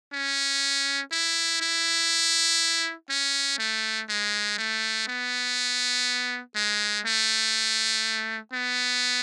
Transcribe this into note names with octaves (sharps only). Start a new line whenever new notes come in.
C#4
E4
E4
C#4
A3
G#3
A3
B3
G#3
A3
B3